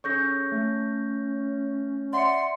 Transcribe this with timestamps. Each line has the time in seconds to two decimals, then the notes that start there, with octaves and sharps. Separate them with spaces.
0.04 C#4 G#4 A4 C#5 C#6 G6 A#6
0.52 A3
2.13 D5 E5 F#5 C6 C#7